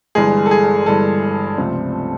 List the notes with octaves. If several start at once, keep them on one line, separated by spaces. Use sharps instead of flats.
G1 G2 E3 G#3 G#4
A4
G#4
G1 G2 E3 G#3 A4
C#2 C3 F3 A3 C4